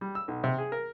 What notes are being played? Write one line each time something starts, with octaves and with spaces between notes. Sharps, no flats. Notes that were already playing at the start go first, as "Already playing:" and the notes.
G3
E6
B1
C3
G#4
A#4